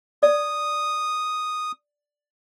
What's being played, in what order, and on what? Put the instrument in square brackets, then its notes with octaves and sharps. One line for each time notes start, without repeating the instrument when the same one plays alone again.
[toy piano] D5 [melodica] D#6